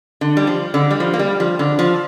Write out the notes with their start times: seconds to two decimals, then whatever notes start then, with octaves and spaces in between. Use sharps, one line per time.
0.21 D3
0.37 G3
0.47 F3
0.74 D3
0.91 G3
1.00 F3
1.14 A#3
1.19 G3
1.40 F3
1.59 D3
1.79 F3